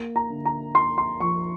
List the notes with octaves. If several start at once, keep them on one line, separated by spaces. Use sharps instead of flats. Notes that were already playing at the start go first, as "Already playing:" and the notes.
Already playing: A#3
A#5
D3
A#5
A#3 C6
C6
F3 C#6